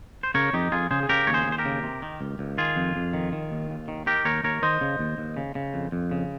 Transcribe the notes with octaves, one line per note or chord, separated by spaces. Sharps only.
C5
C#3 A#4 C#5
F2 D#4 G4
F2 F4 G#4
C#3 G#4 C5
G#4
C#3 G4 A#4
D#2 C#5
G#4 C5
D#2
C5
G4 A#4
C#3
C3
D#3
C#2
C#2
D#3 F4 G#4
F2
F2
D#3
D#3
D#2
D#2
D#3
D#3 G4 A#4
D#2 A#4 C#5
D#2 A#4 C#5
D#3 C5 D#5
C#3
D#2
D#2
C#3
C#3
F2
F2
C#3